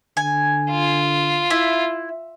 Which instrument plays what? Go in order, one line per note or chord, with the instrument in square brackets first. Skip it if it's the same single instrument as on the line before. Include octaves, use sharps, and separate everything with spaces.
[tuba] D3 [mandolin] G#5
[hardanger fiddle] F4
[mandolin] E4